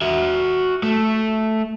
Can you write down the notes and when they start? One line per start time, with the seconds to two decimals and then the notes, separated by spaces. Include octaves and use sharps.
0.01 F#4 E5
0.83 A3